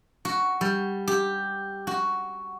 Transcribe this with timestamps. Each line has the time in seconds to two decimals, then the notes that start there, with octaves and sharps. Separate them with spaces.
0.25 F#4
0.61 G3
1.07 G4
1.87 F#4